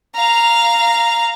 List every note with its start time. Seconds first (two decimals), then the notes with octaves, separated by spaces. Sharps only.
0.15 F5 A#5